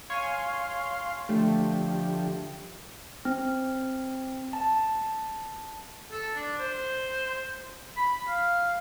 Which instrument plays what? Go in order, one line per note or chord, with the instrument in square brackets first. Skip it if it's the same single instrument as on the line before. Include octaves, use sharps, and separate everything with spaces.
[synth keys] C#5 G#5 [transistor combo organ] F5 C6
[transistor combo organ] D3 F3 G4 [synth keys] A3
[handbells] C4
A5
[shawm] A4
D4
C5
B5
F5